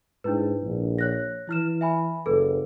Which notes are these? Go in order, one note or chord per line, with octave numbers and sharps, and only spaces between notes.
G#2 D4 E4 B4
A#1
C#5 F#6 A#6
E3 E4 F6 E7
E5 G#5 B5
F#1 A4 B4